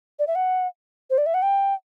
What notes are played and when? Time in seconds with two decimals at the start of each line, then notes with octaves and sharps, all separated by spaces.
0.19 D5
0.27 E5
0.35 F#5
1.10 C5
1.18 D5
1.26 E5
1.34 F#5
1.42 G5